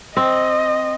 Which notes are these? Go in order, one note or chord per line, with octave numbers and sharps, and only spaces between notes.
C4 D#5